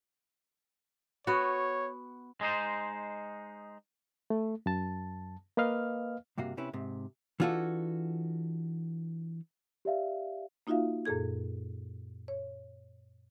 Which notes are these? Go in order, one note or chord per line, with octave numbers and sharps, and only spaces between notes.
B3 F#4 C#5
G#3 D#4 C5
A3
F#2 A5
A#3 B4 D#5 F5 F6
G2 C3 A#3 F#4 F5
C3 C#4 E4 B4
G#2 C3
E3 D4 F4 F#4 A4
G4 D5 E5 F5
A#3 D#4 F4 F#4 E5 F5
F#2 A#2 G#4 A4 G#6
C#5